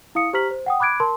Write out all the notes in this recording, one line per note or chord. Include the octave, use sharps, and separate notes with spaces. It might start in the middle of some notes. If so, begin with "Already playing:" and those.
E4 F5 D#6 C#7
G4 C5 A#5 F6 B6 F#7
C5
F#5 G5 D#6
B5 D6 F#6 G#6 D7
A#4 A5 C6